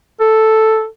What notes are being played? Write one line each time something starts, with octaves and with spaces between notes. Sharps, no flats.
A4